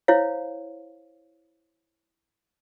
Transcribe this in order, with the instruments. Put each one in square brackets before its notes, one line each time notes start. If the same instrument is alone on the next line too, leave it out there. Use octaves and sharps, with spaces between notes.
[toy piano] E4 C5 C#5 F5